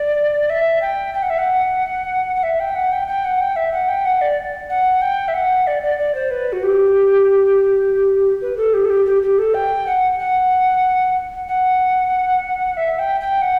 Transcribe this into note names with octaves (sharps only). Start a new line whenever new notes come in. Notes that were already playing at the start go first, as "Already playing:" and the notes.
Already playing: D5
E5
G5
G5
F#5
E5
F#5
F#5
E5
G5
F#5
G5
G5
F#5
G5
E5
F#5
G5
F#5
D5
F#5
G5
E5
F#5
D5
D5
D5
C5
B4
F#4
G4
B4
A4
G4
A4
G4
G4
G4
A4
G5
F#5
F#5
F#5
E5
G5
G5
F#5